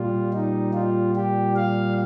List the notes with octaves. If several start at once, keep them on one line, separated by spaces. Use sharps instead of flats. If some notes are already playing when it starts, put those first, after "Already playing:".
Already playing: A#2 G3 F4
D#4
F4
G4
F5